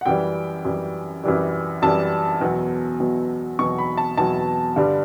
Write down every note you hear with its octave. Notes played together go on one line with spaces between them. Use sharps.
F#5
F#2 E3 G3 G5
F#2 E3 G3
F#2 E3 G3
F#2 E3 G3 A5
E2 B2 F#3
E2 B2 F#3
E2 B2 F#3 C#6
B5
A5
E2 B2 F#3 A5
G2 D3 G3